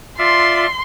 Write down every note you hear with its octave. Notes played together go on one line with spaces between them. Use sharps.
F4 D5 E5 C6